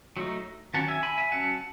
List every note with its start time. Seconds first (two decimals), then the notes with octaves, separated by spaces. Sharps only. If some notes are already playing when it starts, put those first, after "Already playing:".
0.17 F#3 A3 D#4
0.74 D#3 F#3 C#4 F#5 A5
0.88 E5 G#5
1.03 G#5 B5
1.17 E5 G#5
1.32 F#3 C#4 F#5 A5